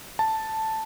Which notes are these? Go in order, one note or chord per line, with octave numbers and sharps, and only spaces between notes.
A5